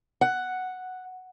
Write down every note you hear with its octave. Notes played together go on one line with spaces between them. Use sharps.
F#5